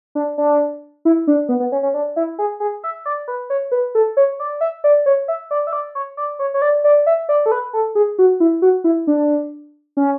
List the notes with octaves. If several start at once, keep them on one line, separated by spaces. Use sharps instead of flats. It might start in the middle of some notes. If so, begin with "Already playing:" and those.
D4
D4
E4
D4
B3
B3
C#4
C#4
D4
E4
G#4
G#4
E5
D5
B4
C#5
B4
A4
C#5
D5
E5
D5
C#5
E5
D5
E5
D5
C#5
D5
C#5
C#5
D5
D5
E5
D5
A4
B4
A4
G#4
F#4
E4
F#4
E4
D4
C#4